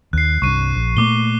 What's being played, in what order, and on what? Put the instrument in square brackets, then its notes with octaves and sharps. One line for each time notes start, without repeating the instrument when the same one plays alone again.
[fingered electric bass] D#2 [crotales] F#6 C7
[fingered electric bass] C2 G2 [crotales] C#6 D#7
[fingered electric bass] A#1
[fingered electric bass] A#2 A3 A#3 [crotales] C#6 D6 G7